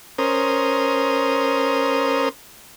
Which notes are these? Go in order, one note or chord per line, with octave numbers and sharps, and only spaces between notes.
C#4 A#4 C5 D#6